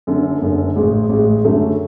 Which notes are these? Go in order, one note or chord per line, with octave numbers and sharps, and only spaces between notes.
F#1 F#2 D3
F#1 F#2 D3
A1 G#2 G#3
A1 G#2 G#3
F#2 D3 F#3 A3